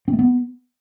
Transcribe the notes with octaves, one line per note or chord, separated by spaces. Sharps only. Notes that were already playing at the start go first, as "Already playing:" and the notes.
C4
A3
B3